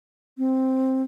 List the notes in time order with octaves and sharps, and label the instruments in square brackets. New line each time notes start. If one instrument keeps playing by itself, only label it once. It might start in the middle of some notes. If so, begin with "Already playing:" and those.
[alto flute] C4